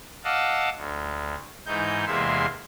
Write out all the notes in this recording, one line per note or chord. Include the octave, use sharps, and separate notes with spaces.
D#5 F5 F#5 A5 D6 E6
D2
G#2 E3 D#4 G6
E2 C3 G#3 A#3 E5 C6